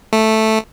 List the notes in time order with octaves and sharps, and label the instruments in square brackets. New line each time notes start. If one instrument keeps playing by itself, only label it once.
[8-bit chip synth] A3